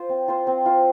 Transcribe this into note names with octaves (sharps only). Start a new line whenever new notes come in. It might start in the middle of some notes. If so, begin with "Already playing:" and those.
Already playing: F4 C5
C4
F4 C5
C4
F4 C5